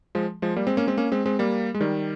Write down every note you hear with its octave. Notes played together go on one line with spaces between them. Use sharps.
F3 G#3
F3 G#3
G3 A#3
G#3 C4
A#3 C#4
G#3 C4
A#3 C#4
G#3 C4
G#3 C4
G3 A#3
G#3
D#3 G3